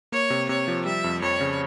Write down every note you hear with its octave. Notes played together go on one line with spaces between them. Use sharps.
A#3 C#5
C3
C3 C#5
F3
G3 E5
F2
F2 C#5
C#3